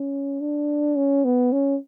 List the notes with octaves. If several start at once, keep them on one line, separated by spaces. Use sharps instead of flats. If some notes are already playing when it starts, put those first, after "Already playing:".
Already playing: C#4
D4
C#4
B3
C#4